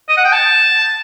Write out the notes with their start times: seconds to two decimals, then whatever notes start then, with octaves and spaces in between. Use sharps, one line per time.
0.08 D#5
0.17 F#5
0.25 G5
0.33 A5